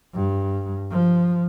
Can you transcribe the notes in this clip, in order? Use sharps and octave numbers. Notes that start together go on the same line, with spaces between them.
G2
F3